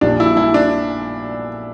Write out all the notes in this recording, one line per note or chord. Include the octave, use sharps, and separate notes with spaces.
A#1 A#2 G3 D4
E4
E4
D4